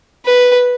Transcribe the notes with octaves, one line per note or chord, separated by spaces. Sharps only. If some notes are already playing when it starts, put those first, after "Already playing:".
B4